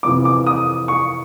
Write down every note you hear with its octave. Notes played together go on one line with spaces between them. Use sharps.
F2 C3 E3 D6
D6
D#6
C#6